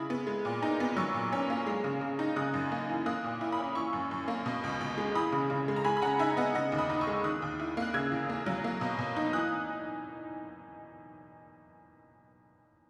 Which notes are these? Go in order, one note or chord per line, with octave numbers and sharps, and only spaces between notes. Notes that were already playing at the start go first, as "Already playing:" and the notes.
Already playing: C#3 G#3 E4 B5 D#6
B3
G#3
A#2
D#4
B3
F#3 C#6 E6
A#2
C#4
A#3
G#3
C#3
C#3
D#4
C#3 D#6 F#6
F#2
A#3
E3
A#3 D#6 F#6
A#2
E4
B5 D#6
C#4
E3 C#6 E6
F#2
F#2
A#3
B2
C#2
C#2
G#3
E3 B5 D#6
C#3
C#3
G#3
A#5
G#3 G#5 B5
B5
C#3 F#5 A#5
D#4 E5 G#5
B3 D#5 F#5
C#3 D#5 F#5
D#2
B5 D#6
D#4
C#6 E6
G#3
D#3 D#6 F#6
D#2
E4
A#3
F#6
C#3 E6 G#6
E2
A#3
F#3
A#3
B2
B2
D#4
E3 D#6 F#6